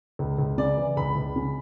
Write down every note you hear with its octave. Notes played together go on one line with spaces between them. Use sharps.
C#2
C#2
C#3 D5
E3
C#2 B5
C#2
C#3